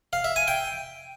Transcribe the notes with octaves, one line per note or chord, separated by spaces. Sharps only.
F5
E5
G#5
G5